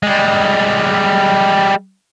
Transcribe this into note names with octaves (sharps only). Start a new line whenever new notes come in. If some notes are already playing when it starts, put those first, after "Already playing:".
G3 G#3